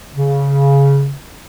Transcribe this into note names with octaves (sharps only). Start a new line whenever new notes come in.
C#3